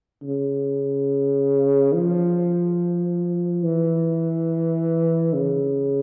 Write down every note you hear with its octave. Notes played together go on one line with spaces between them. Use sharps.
C#3
F3
E3
C#3